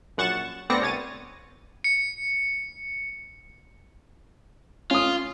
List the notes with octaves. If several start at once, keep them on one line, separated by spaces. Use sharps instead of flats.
A#1 F#2 F#5 C#6 A6 E7
D2 B3 C4 D5 A#6 C#7
C2 C#5 A6 D#7
C#7
C#4 F4 D#6